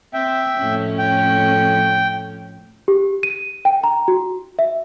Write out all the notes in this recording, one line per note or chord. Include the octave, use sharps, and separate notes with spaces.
C4 E5 G5
F2 A2 C#4
G5
G4
D#7
G5
A#5
F#4
E5